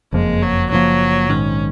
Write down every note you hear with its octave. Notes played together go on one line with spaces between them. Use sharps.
F#1 F2 F3 G#3 A#3
F#3
F#1 F2 F3 F#3 A#3
A#1 G#2 D#3 C#4